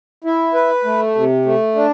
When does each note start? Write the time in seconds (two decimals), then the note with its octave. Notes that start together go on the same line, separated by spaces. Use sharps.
0.24 E4
0.54 B4
0.84 A3
1.15 C3
1.45 A3
1.75 D4